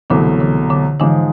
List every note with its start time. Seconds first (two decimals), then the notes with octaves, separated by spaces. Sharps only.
0.10 C2 B2 D3 E3 F#3 A3
0.40 D3 E3
0.70 D3
1.00 G#2 D3 E3 F3 G#3